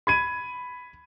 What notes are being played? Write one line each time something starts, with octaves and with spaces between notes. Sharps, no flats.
B5 G#6 D#7